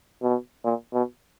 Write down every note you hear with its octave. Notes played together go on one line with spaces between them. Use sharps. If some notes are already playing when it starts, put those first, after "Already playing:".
B2
A#2
B2